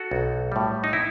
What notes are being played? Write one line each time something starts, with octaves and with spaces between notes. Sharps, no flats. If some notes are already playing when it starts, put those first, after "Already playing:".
Already playing: F#4 A4
B1
A2 G3
D#4
E4